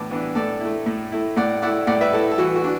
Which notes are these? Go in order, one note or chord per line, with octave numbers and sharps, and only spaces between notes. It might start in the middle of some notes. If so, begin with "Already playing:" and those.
Already playing: A2 E3 B3 D4 A5 D6
E3 B3 D4
A2 A4 D5
A3 E4
A2
A3 E4
A2 D5 F#5
A3 E4 D5 F#5
A2 D5 F#5
B4 E5
A3 E4 A4
A4
E3 F#4
F#4
D4